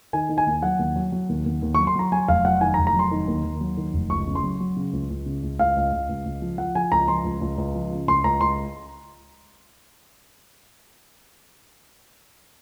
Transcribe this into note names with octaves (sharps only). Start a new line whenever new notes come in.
D#3 G#5
D#3
G#5
D#2
F#3 F#5
D#2
F#3
F#3
D#2
D#2
D#2
F#3 C#6
C6
F#3 A#5
F#3 G#5
F1 F5
F#3 F#5
D#3 G#5
A#5
F1
A#5
F#3 C6
D#3
D#2
D#2
F#3
D#3
F1
C#2 C#6
C#3
C6
F#3
F#3
C#3
C#2
C#2
C#3
C#2
C#2 F5
C#2
C#2
C#2
C#2
F3
F3 F#5
F3 G#5
C#2 A#5
F3 C6
C#2
C#2
C#2
F3
C#3
C#2 C6
C#2 A#5
C#2 C6